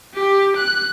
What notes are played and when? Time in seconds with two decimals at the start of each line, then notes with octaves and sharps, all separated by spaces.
0.14 G4
0.56 F#6